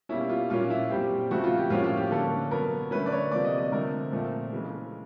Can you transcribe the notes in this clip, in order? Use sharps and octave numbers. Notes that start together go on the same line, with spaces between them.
B2 G3 A#3 C#4 E4
F4
A#2 F#3 A#3 C#4 F4
E4
A#2 G3 C4 G4
C#3 F3 A3 C4 F#4
F4
G4
A2 F3 A#3 C#4 F4
F4
G4
D3 F#3 A#3 C#4 A4
B2 F#3 B3 A#4
D3 F#3 A3 C#4 B4
D5
C#5
C3 F3 A#3 D5
D#5
D#5
D3 F3 A3 C4 A#4
A#2 F3 A3 C4
C#3 E3 G#3